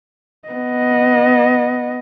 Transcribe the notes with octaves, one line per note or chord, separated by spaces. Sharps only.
B3 D#5